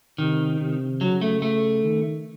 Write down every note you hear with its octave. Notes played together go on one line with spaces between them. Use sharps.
C3 D#3
C3
C#3 F#3
A3
A3
D#3